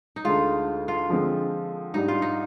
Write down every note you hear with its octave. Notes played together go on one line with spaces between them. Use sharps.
D#4
D2 D3 G#3 F4
F4
D3 F3 G#3 C4
G#2 G3 D4 D#4
F4
D#4